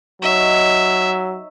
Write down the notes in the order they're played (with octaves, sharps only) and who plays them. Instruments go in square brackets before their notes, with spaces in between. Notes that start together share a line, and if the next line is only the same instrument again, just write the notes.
[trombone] F#3 [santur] D#4 C#5 [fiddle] E5